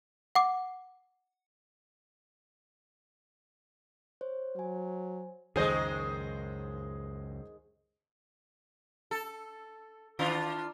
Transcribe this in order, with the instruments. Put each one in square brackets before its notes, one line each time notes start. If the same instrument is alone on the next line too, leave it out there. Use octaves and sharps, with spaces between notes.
[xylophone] F#5 D6
[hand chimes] C5 C#5
[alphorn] F#3 [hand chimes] C5 G#5
[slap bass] C#2 F#2 [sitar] D#3 G#3 [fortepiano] G#4 C5 D#5
[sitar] A4
D#3 D4 F4